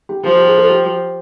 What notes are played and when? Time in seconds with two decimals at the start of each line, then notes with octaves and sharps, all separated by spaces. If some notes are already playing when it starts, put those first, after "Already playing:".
0.09 G4
0.24 F3 G4
0.35 G4
0.47 G#4
0.58 A4
0.69 G4